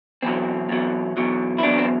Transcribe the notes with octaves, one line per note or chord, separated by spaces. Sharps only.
E2 B2 F#3 C4
E2 B2 F#3
E2 B2 F#3
E4
E2 B2 F#3 D4
C4